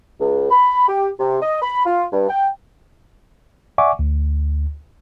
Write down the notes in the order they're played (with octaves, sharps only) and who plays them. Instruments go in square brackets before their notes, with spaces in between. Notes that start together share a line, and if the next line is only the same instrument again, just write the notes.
[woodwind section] C#2
B5
G4
C3
D#5
B5
F4
G2
G5
[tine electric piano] D5 E5 F#5 G#5 C#6 D6
D2